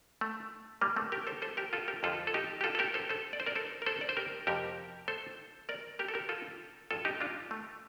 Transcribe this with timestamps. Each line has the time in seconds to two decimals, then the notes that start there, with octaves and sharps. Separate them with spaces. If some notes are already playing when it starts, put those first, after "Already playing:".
0.21 A3
0.81 G3 A#3
0.96 A3 C4
1.12 G4 A#4
1.27 A4 C5
1.42 A4 C5
1.57 G4 A#4
1.73 F4 A4
1.88 G4 A#4
2.03 F2 D3 F3 F4 A4
2.27 A4
2.34 D#4 G4
2.61 G4
2.64 F4 A4
2.75 A4
2.79 G4 A#4
2.94 A4 C5
3.09 A4 C5
3.33 D5
3.40 C5
3.46 A#4 D5
3.55 A4 C5
3.82 A#4
3.86 A4 C5
4.01 D5
4.09 C5
4.17 G4 A#4
4.47 F2 C3 D#3 G4 A#4
5.08 A4 C5
5.69 A#4 D5
5.99 G4 A#4
6.08 A4
6.14 G4 A#4
6.29 F4 A4
6.91 G2 F3 F4 A4
7.05 D#4 G4
7.21 D4 F4
7.51 A3